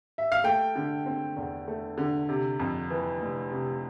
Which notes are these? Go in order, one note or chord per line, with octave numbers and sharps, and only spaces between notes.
E5
F5
A3 G5
D3
C4
E2
A3
D3
C3
F2
E3
F1
C3